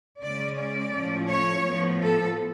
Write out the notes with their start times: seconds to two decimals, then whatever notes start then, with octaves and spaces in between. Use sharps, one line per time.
0.22 C#3 G#3 C#4 D5
0.58 D5
0.94 A2 F3 A3 C#4
1.30 C#5
1.65 A2 F3 B3
2.00 A4